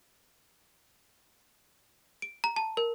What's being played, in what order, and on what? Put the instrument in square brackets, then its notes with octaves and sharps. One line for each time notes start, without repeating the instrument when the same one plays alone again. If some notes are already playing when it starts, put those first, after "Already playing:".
[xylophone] D7
A#5
A5
A#4